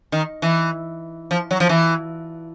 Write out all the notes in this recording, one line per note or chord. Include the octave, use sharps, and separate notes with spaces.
D#3
E3
F3
F#3
F3
E3